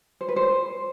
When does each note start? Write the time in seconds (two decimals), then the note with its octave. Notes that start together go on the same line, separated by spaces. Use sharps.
0.21 C5
0.29 B4
0.36 C5